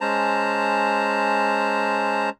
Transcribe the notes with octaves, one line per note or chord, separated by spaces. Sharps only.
G#3 C#4 C5 A5 A#5